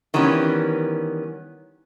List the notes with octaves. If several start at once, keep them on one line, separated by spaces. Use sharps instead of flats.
D#3 E3 G3 B3 C#4